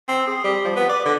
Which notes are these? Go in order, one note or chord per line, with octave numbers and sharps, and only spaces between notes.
C4
G#4
G3
F3
B3
D5
D3